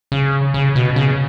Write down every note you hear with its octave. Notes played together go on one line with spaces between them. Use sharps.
C#3
C#3
B2
C#3